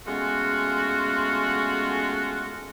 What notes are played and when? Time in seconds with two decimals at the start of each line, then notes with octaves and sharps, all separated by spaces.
0.07 G#3 A3 B3 C#4 F4 F#4